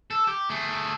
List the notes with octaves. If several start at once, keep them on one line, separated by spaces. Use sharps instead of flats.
A4
G4
A3 G#4